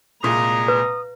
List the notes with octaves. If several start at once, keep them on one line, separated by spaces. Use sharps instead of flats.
C2 A#2 G#3 A#5 D#6
B4